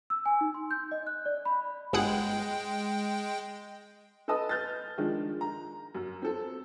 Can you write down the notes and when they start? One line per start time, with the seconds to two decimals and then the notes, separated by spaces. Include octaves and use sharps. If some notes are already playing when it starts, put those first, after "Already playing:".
0.10 E6
0.26 G#5
0.41 D#4
0.54 C6
0.71 G6
0.91 D#5
1.07 F#6
1.26 D5
1.45 B5
1.93 G1 G#3 G#4 F#5 G5
4.28 A4 B4 D#5 A5 D#6
4.49 F6 G6 A6
4.98 D#3 F3 G#3 D4
5.41 A#5
5.95 F#2
6.22 C4 A4